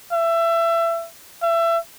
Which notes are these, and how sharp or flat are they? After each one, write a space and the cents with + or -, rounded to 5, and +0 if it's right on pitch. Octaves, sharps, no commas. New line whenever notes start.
E5 +25
E5 +25